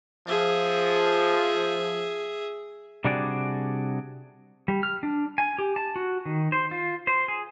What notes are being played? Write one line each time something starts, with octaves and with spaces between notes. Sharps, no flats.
F3 G#4 E5
C3 G3 D4 F#4 G#4 D5
G3
F6
D4
G#5
G4
A5
F#4
D#3
C5
F4
C5
G#4